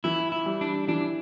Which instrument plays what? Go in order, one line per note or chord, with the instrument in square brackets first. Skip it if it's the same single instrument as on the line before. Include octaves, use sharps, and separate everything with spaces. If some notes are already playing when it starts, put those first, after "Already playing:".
[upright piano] E3 [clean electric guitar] E4
[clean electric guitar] E4
[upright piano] G3
[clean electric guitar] D4
[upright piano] E3 [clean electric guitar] D4